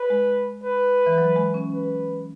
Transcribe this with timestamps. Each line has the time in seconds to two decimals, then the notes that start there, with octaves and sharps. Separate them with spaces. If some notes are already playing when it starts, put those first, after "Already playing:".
Already playing: B4
0.10 G#3
0.64 B4
1.06 E3
1.18 F#3
1.36 G#3
1.54 C#4
1.71 B4